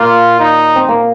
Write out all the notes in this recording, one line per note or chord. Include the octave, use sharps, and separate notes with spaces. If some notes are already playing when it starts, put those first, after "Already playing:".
Already playing: A#2 A#3 F4
D#4
C4
A#2 A#3